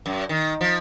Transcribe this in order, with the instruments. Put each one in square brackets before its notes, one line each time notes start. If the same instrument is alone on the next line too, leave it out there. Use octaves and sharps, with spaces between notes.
[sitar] F#2
D#3
F3